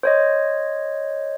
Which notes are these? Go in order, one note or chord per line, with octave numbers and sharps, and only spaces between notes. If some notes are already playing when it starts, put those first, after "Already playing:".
C5 C#5 D#5